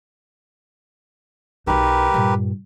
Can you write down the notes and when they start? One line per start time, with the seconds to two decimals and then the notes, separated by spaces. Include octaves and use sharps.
1.67 B1 D#4 G4 A#4 B4
2.14 G2 A#2